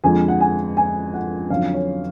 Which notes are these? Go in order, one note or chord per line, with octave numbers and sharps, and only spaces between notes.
F2 D3 G#3 G#5
F#5
G#5
G#5
F#5
F2 D3 F#3 C#4 F5
C#5